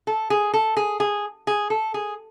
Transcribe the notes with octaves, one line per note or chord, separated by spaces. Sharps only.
A4
G#4
A4
G#4
G#4
G#4
A4
G#4